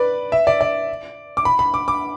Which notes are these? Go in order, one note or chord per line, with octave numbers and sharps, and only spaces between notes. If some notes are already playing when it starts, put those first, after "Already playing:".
Already playing: B4 D5
E5
D5
D5
D6
B5
B5
D6
D6